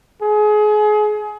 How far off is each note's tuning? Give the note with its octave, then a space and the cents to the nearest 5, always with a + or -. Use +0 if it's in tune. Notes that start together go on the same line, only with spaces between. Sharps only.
G#4 +30